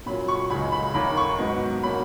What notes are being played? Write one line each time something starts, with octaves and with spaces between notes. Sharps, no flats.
A#2 F#3 C#4 B5
C#6
C#2 C#3 G#3 D#4 B5
B5
D#2 D#3 A#3 C#4 B5
C#6
G#2 F#3 B3 D#4
B2 A#3 C#4 B5